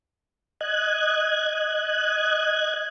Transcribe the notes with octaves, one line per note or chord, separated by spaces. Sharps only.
D#5 F#6 G#6